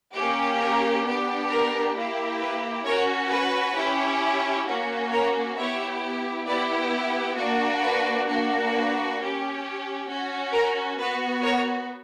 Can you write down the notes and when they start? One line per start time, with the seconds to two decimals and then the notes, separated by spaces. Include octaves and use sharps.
0.14 A#3 C#4 G4
0.59 A#4
1.04 B3 D4 G4
1.49 A#4
1.95 A#3 E4 G4
2.40 B4
2.84 C#4 F#4 A#4 C#5
3.30 B4
3.75 C#4 E4 G4
4.66 A#3 C#4 F#4
5.11 A#4 C#5
5.56 B3 E4 G4 C#5 E5
6.46 B3 E4 G4 B4 D5
7.36 A#3 D4 F#4
7.81 B4
8.27 A#3 D4 F#4
8.72 B4
9.17 C#4 G4
10.08 C#4 F#4
10.52 A#4
10.97 B3 F#4 B4
11.43 A#4 C#5